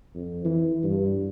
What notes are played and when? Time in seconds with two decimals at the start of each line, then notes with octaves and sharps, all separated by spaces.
0.15 F2
0.45 E3
0.84 G2